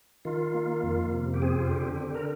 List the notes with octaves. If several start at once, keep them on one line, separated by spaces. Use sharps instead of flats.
D#3 F4
A#3
F2
C3
G4
C4 G#4
F4
D3 G4
D3
A#4